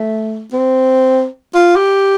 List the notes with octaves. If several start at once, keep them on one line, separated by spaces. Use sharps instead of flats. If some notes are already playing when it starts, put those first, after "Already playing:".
Already playing: A3
C4
F4
G4